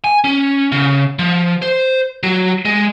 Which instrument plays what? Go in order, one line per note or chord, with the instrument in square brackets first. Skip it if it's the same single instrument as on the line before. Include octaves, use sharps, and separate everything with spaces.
[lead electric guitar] G#5
C#4
C#3
F3
C5
F#3
G#3